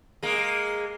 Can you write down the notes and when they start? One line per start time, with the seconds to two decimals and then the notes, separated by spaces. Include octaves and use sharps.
0.23 G#3 A#3